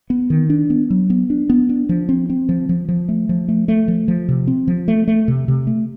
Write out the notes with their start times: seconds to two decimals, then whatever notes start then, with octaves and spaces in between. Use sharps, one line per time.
0.10 B3
0.30 D#3
0.50 D4
0.70 B3
0.90 F#3
1.10 B3
1.30 D4
1.50 B3
1.69 D4
1.89 F3
2.09 C4
2.30 C4
2.49 F3
2.69 F3
2.89 F3
3.09 A3
3.29 F3
3.48 A3
3.68 A3
3.88 F3
4.08 F3
4.28 C3
4.47 C4
4.68 F3
4.88 A3
5.08 A3
5.28 C3
5.48 C3
5.67 A3